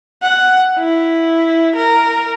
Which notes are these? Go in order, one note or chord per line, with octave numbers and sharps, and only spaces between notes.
F#5
E4
A#4